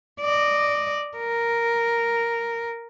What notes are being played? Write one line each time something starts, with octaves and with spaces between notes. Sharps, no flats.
D5 D#5
A#4